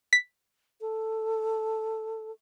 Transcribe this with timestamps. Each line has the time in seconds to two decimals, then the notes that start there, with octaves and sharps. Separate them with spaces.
0.13 B6
0.81 A4